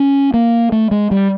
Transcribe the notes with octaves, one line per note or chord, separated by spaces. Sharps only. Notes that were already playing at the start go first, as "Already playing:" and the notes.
Already playing: C#4
A#3
A3
G#3
G3